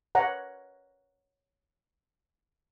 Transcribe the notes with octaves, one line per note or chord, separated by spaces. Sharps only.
C#5 F#5 A#5